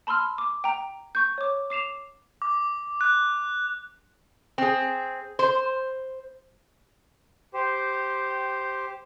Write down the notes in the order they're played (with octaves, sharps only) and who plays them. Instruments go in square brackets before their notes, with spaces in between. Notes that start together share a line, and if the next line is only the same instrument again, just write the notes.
[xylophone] A5 B5 C6 E6 F6
D6
G5 A#5
C#6 G6
C#5 D6
D6 C7 E7 F7
[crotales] D6
F#6
[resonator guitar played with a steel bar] C4 G#4
C5
[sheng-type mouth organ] G4 C5